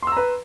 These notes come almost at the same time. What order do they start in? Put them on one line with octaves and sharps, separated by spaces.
C6 E6 A#5 B4